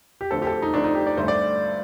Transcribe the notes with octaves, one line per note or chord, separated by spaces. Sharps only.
G4
D2 D3 F3 C4 A4
G4
A4
G4
D#4
D2 D3 F3 C4 D4
D#4
G4
D5
G2 D3 A3 C4 C5
D5